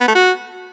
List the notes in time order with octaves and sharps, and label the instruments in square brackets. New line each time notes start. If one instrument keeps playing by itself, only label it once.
[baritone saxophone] B3
A3
F#4